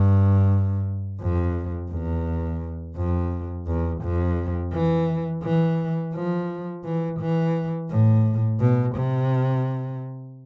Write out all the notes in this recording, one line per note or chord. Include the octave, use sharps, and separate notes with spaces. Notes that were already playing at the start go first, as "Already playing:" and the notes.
Already playing: G2
F2
E2
F2
E2
F2
E3
E3
F3
E3
E3
A2
B2
C3